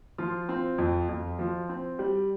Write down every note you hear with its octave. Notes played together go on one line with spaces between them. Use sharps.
F3 F4
C4
F2
F2
F3
C4
G3 G4